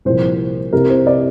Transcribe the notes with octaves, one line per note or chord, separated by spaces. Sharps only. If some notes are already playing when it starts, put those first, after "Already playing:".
C2 A#2 F3 C5
C2 C3 G3 A#4
C5
D5